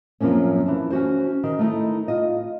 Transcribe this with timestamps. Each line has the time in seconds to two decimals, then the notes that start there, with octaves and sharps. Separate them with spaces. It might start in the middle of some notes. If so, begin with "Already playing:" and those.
0.21 F#2 F3 A#3 C4 C#4
0.66 E3 A5
0.90 C#4 F#4 C5
1.43 D#3
1.59 A3 D#4 E4
2.08 F4 D#5